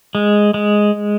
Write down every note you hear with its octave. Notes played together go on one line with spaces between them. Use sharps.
G#3
G#3